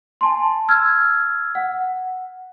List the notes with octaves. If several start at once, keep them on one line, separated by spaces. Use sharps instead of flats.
G#5 A5 C6
E6 F6 G#6
F#5